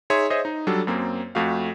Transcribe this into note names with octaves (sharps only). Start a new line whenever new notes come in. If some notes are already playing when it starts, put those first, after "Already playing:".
D#4 G#4 C#5 E5 C6
G#4 C5 C#5 D#5 E5
D#4
F#3 G3 D4 A4
F#2 A#3 C4
F2 A3 F#4 F5